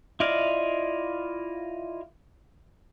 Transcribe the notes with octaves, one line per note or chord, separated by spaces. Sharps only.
E4 F4 D5 D#5 F5